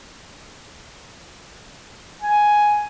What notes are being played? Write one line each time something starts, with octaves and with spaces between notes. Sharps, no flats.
G#5